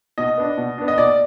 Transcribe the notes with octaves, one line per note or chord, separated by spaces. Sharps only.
B2 D#5
B3 D4
B2
B3 D4
D#5
B2 D5